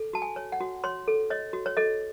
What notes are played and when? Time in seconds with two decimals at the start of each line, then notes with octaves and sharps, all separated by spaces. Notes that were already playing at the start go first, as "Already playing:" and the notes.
Already playing: A4
0.13 F#4 A5
0.22 G#5
0.36 C#5
0.52 F#5
0.60 F#4
0.84 C#5 C6
1.08 A4
1.30 C#5 D#5
1.53 F#4
1.66 C#5
1.77 A4 D#5